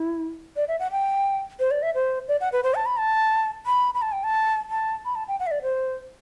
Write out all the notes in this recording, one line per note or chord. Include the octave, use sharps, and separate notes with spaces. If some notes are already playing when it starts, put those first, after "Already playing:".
Already playing: E4
D5
E5
F#5
G5
C5
D5
E5
C5
D5
F#5
B4
C5
A5
B5
A5
B5
B5
A5
G5
A5
A5
B5
A5
G5
F#5
E5
D5
C5